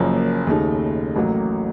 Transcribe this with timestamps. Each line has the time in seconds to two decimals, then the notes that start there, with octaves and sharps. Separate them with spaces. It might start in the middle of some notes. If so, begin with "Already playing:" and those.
Already playing: F#1 F#2 F3 A#3
0.47 D#2 C#3 A3 D#4
1.16 A1 A2 F#3 A#3